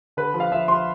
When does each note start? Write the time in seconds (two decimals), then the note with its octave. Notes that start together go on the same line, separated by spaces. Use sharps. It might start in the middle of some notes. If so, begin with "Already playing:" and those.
0.17 D3 B4
0.34 F3
0.40 F5
0.52 F3 E5
0.68 F3 C6